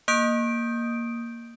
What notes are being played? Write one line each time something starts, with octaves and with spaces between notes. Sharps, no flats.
A#3 D#6 G6 D7